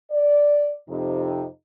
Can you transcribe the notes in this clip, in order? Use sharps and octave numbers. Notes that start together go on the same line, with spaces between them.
D5
F2 C3 D#4